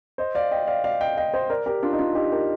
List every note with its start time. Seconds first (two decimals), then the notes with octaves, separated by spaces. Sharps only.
0.18 C5 D#5
0.35 D5 F5
0.51 D#5 G5
0.67 D5 F5
0.84 D5 F5
1.01 D#5 G5
1.17 D#5 G5
1.34 C5 D#5
1.50 A#4 D5
1.66 G4 A#4
1.83 D4 F4
1.93 D#4
1.99 D4 F4
2.15 D#4 G4
2.32 G4 A#4